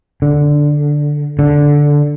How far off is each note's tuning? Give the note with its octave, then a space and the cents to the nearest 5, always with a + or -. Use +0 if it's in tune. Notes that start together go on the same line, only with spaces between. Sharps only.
D3 +0
D3 -5